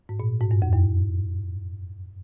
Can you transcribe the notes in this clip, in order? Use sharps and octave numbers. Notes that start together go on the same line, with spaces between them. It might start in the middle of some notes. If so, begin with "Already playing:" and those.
G#2
A#2
G#2
G2
F2
F#2